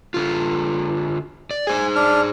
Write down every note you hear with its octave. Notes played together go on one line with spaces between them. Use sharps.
D3 F4
D5
G#4 C5 G#5
D4 F6